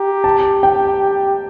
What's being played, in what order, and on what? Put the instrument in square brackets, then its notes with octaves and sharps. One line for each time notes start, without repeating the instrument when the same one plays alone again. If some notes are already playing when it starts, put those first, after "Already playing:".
Already playing: [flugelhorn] G4 [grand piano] A#5
[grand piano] A5
G5